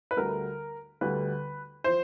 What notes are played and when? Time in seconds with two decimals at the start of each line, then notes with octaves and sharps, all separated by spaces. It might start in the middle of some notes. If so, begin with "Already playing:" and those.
0.11 B4
0.17 D2 D3 G3 A#4
1.01 D2 D3 G3 B4
1.84 F3 C5